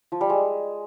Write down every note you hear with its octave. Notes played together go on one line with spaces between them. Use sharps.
F3
G3
G#3